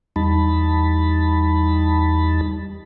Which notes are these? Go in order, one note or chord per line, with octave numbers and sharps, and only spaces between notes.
E2 G3 D#4 A5 B5